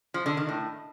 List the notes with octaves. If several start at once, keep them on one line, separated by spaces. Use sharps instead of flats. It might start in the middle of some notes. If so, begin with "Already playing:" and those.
F3
D3
D#3
A2